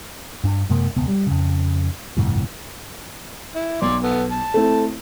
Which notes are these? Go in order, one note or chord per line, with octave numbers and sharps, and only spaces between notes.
G2 D4
F#2 C3 G#3 A#3
E1 C#2 B3
G3
F2 C#3
G1 C2 F2 A2
E4
B1 D5 C6 D6
B3 A4
A5
A3 C4 E4